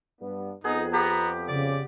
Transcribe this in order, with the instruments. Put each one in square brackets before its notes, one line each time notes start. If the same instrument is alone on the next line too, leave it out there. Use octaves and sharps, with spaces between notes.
[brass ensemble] G2 B3 D4
[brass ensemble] F2 [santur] B3 G#4 [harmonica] D#4
[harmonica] B3 A#5 [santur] G4
[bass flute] C#3 [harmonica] D5